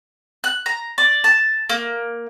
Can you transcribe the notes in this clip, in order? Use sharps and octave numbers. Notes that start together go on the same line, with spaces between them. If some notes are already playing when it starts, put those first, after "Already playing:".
F#6
A#5
D5
A5
A#3